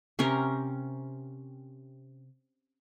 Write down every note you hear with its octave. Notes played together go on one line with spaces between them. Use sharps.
C3 C#4 A#4